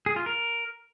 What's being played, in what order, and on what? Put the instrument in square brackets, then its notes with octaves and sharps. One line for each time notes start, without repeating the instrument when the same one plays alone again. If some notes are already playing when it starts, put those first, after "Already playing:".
[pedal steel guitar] G#4
F4
A#4